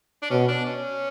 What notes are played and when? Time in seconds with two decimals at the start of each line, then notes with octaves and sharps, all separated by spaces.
0.22 D4
0.30 B2 C#4
0.48 D4
0.65 C#4